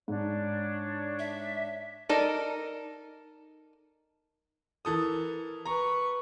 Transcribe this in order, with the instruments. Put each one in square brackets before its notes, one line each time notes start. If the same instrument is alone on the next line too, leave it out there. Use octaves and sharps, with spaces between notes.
[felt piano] G#2 [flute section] D4 C#5
[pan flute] E5
[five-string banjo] D#4 A4 A#4 D5
[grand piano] E3 A4 D#6 [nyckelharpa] A#4
[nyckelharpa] B4 C#6 [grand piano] A#5